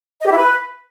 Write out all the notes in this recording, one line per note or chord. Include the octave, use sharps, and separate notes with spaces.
D#5
G4
E4
B4